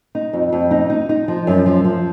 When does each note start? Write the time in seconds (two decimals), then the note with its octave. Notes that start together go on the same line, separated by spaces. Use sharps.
0.15 D#4
0.33 F2
0.52 F2
0.71 D#4
0.90 D#4
1.09 D#4
1.28 F3
1.47 F#2
1.66 F3
1.85 F3